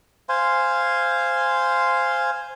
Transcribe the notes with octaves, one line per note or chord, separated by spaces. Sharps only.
C5 F5 G#5 C6